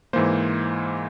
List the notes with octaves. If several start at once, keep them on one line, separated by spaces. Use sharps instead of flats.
G#2 E3 A#3 C5